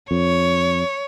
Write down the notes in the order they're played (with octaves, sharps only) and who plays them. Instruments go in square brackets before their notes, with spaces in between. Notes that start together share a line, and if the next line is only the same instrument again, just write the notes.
[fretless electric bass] F2 [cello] C#5